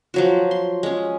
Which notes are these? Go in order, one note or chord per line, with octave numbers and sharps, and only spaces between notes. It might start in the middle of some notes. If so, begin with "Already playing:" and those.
F3 F#3 F#4
C6
G#3 C#4